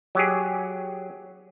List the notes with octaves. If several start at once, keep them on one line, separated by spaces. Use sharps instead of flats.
F#3 G4 G#4